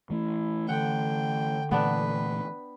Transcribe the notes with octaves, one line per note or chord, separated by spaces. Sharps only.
E3 A3 E4
D3 F#5 G5
A#2 E3 A3 B3 D4 B4